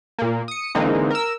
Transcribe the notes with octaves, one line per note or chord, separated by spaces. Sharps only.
A#2 A#3
D#6 C#7
D3 E3 G#3 A#3 C4 D#4
A#4 E6